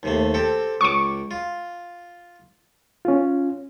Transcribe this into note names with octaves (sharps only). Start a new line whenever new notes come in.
D#2 C3 A3
C4 G4 A4
C#2 C#6 D6
F4
C#4 F4